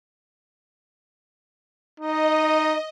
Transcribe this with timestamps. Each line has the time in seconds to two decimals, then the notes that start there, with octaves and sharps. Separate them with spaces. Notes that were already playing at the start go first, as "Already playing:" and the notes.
2.00 D#4 D#5